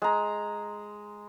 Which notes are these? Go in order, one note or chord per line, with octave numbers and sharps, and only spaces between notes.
G#3 A#5